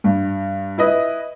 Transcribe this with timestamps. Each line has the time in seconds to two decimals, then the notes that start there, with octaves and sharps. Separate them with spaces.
0.04 G2
0.78 E4 B4 D#5